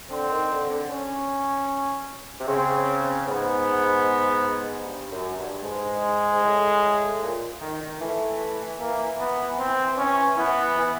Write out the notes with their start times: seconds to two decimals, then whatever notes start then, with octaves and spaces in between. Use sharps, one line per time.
0.10 D3 C4
0.30 D#3
0.50 D3
0.70 D3
0.89 C#4
2.40 C3
2.48 C#3 C4
3.27 G#2 B3
4.85 G2
5.11 F#2
5.37 G2
5.63 G#2 G#3
6.34 G#2
6.42 A2
7.22 A#2
7.61 D#3
7.81 D#3
8.01 E3 A3
8.80 A#3
9.19 B3
9.59 C4
9.98 C#4
10.37 E3 B3
10.77 E3